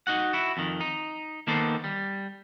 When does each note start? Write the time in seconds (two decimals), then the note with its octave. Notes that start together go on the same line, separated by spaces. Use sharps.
0.07 D#4 F#4 F#5
0.33 E4 F#4
0.57 F2 D#3
0.81 D#4
1.47 D#3 A#3 B3 A4 C5
1.84 G3